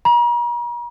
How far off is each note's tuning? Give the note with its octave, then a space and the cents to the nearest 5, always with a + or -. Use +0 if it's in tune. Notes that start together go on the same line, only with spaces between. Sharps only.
A#5 +45